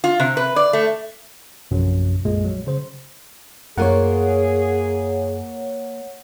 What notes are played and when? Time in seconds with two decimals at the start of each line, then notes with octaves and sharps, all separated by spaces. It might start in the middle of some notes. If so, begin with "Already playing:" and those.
0.04 F4
0.20 C3
0.37 B4
0.56 D5
0.73 A3
1.71 A#1 F#2 C3 F#3
2.25 B1 F#2 A#2 G#3
2.45 F#3 G3
2.67 C#3 C5
3.77 F#2 A#3 F4 G#4 A#4 C#5 F#5